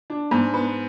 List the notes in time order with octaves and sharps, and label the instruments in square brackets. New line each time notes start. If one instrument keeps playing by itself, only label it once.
[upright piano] D4
G#2
B3